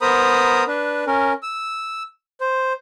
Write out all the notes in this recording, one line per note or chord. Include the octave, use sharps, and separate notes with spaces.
B3 A#4 C5 A#5 B5 D#6
D4 B4
C#4 A#4
E6
C5